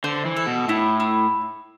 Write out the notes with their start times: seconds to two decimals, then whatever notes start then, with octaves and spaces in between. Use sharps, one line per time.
0.04 D3 C5
0.25 E3
0.36 A4
0.46 B2
0.68 A2 E4
1.00 E4